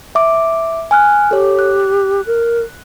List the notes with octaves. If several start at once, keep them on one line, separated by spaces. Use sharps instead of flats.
E5 D6
G#5 F6 F#6
G4 A4 C#5
F#6
A#4